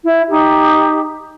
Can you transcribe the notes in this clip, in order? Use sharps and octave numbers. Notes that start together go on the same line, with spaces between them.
E4
D#4 G4